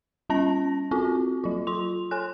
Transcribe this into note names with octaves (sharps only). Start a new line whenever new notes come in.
G3 C#4 A5 A#6
C4 F4 F#4
F#3 F4
F4 C6 F7
A4 G#5 F#6